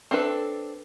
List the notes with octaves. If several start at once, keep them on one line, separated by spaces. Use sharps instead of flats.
C4 D4 A4 B4